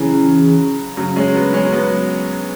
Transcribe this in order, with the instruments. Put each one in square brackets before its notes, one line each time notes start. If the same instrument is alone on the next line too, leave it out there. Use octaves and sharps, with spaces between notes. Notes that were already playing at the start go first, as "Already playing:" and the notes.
Already playing: [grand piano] C#3 F#3 [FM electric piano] E3 C#4 G#4
[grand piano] C#3 F#3
G#3 C#4
F#3 B3
G#3 C#4
F#3 B3